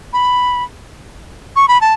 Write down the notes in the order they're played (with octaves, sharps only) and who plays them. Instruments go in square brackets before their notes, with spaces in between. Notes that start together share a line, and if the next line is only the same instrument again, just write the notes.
[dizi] B5
C#6
B5
A5